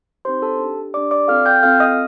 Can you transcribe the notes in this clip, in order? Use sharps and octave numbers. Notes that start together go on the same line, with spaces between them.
C4 D#4 G4 C5 C6
A4 A5
D4 G4
D4 G4 D5 D6
D5 D6
C4 F4 A4 F5 F6
G5 G6
C4 F4 A4 F5 F6
D#5 D#6